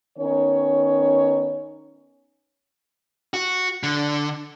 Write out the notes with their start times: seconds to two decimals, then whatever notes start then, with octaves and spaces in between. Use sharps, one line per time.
0.18 D#3 B3 C#4 D#4 C#5
3.34 F#4
3.83 D3